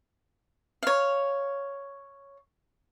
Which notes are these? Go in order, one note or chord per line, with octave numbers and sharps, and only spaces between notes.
C#5 F5